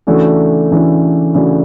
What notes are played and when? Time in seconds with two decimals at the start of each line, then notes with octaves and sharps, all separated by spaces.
0.07 C#3 E3 A3 D4 F#4
0.71 C#3 E3 A3 D4 F#4
1.34 C#3 E3 A3 D4 F#4